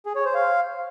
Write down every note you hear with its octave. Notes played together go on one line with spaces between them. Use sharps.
G#4
C#5
C5
F5